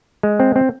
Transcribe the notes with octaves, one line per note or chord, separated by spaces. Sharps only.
G#3
C4
C4